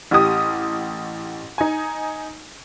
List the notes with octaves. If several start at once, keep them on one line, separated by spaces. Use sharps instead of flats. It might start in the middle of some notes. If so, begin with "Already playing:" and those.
A1 G4 D#6
D#4 G#5